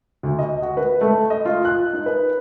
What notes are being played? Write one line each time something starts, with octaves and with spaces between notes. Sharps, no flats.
D2
D#5
F#4
B4
A3
D#5
F4
F#6
D#4
B4